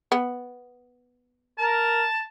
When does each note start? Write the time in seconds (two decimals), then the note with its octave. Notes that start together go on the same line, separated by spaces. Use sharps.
0.12 B3
1.58 A#4 A5